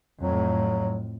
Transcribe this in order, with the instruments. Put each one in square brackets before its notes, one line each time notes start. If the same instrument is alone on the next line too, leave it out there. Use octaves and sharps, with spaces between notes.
[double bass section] F2 A2 [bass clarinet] F#3